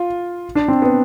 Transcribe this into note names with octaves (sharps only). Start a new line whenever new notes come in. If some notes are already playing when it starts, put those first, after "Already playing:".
Already playing: F4
D4
C4
B3